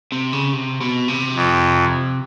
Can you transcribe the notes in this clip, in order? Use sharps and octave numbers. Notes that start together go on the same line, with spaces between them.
C3
C#3
C3
B2
C3
F2